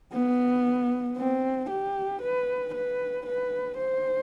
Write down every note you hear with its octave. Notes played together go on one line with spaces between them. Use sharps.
B3
C4
G4
B4
B4
B4
C5